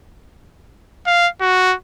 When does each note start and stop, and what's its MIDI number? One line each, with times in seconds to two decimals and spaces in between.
1.07 1.28 77
1.41 1.74 66